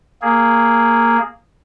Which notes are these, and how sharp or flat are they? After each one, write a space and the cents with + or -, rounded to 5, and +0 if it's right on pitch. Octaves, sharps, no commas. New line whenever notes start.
A#3 -5 G#4 +0